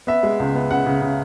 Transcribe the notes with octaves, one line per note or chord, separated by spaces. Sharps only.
B3 E5
G#3
C#2
B3
C#3 F#5
C#3
C#3